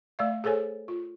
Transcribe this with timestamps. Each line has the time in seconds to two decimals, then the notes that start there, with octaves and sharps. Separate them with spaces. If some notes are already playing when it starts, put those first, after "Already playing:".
0.19 A3 D5 F5
0.44 G#4 A4 C5 C#5 G#5
0.88 F4